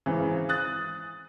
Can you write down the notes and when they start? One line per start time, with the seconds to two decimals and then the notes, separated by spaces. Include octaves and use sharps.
0.06 G#1 C#3 E3
0.49 D#6 F#6 A6